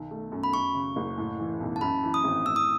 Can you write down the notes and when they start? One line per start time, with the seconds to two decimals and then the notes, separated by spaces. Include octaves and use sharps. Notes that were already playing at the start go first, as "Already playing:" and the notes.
Already playing: B1 D#3
0.11 A3
0.32 F#2
0.44 B5
0.54 F#2 C#6
0.75 C#3
0.96 F#1
1.18 A2
1.39 E3
1.60 B1
1.76 A5
1.81 F#2 B5
2.03 E3
2.14 D#6
2.24 G#1
2.46 A2 E6
2.56 D#6